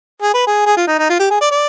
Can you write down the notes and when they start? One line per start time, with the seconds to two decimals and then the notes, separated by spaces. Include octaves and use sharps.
0.22 G#4
0.34 B4
0.47 G#4
0.66 G#4
0.77 F4
0.87 D#4
0.98 D#4
1.09 F4
1.19 G4
1.31 G#4
1.41 D5
1.51 D5